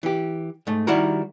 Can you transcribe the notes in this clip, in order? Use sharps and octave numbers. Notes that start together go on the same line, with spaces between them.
E3 G4
G#2 A3
D#3 G3 E4 F#4 A#4